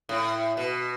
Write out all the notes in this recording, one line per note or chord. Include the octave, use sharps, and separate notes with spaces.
A2
B2